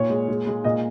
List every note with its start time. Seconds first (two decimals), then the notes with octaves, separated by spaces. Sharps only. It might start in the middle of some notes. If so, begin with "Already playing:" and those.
Already playing: A#2 C#5
0.10 G#3
0.29 G#3
0.47 G#3
0.64 A#2 D#5